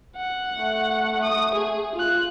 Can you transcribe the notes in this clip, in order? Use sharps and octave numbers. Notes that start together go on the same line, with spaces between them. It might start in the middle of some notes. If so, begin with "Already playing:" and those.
F#5
A3
D#6
G#4
F4 F#6